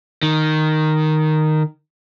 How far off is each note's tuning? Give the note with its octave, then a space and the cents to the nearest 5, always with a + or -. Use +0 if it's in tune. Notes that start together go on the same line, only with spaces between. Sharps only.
D#3 -5